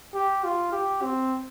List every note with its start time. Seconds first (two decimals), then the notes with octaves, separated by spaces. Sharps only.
0.14 G4
0.44 F4
0.72 G4
1.02 C4